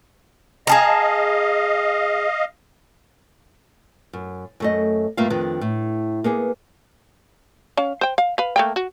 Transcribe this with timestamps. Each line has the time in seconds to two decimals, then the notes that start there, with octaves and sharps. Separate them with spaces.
0.67 G#4 D#5 F5 A5 A#5
4.13 F#2
4.60 F#2 A3 D#5
5.17 G2 A3 A#3 F4 F5
5.30 F2 D#3 D4 F4 B4
5.61 A2
6.24 A#3 B3 G#4
7.77 C#4 F5
8.01 C5 G5
8.18 F5
8.38 B4 F5
8.56 A3 A#3 G5
8.76 F#4